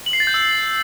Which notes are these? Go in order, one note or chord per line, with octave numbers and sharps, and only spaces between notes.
F#7
C7
A6
G6
E6